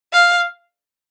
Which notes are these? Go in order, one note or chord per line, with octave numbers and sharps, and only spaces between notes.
F5